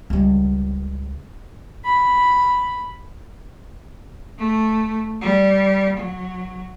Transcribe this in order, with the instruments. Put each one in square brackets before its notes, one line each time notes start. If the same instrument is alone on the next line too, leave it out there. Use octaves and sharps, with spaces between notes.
[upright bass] C#2 G3
[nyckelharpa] B5
[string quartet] A3
G3
F#3